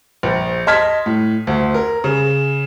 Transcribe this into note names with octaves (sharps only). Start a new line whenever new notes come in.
A#1
D#5 A5 C6 F6 G#6 B6
A2
D2
A#4
C#3